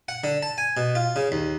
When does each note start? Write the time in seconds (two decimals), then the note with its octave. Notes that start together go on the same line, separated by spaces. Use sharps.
0.08 F#5
0.24 D3
0.43 A5
0.58 G#5
0.77 B2
0.95 F4
1.16 C#3
1.32 D#2